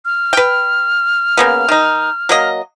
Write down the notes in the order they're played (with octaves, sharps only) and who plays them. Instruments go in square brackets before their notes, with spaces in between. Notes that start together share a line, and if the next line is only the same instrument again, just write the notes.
[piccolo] F6
[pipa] B4 G5
C#3 A#3 B3
D#3 D#4
F#3 A#3 D#5